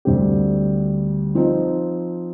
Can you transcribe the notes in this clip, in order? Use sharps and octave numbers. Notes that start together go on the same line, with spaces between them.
D2 D3 G3 C4 G4
F3 C4 D#4